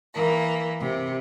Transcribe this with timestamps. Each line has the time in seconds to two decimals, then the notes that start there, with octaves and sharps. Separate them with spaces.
0.13 E3 A#3
0.79 C3